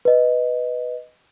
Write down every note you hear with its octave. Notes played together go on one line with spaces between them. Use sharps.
B4 D#5